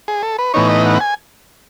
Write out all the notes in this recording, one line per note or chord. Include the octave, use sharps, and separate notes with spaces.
G#4
A4
B4
A2 E3 B3 D#4 C#5
D#5
F#5
G#5